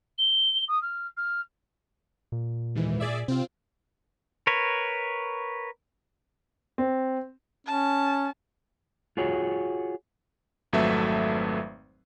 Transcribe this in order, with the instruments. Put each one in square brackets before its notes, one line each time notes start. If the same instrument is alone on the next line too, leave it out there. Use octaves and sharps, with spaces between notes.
[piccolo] G7
D#6
F6
F6
[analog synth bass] A#2
[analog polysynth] D#2 G#2 E3
G#4 D5 E5
[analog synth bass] C3 [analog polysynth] C4 F4
[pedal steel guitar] A#4 B4 C#5
[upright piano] C4
[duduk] C#4 [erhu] A5
[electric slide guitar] F4 F#4 G#4 C#5
[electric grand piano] G#1 F2 F#3 A3 B4 E5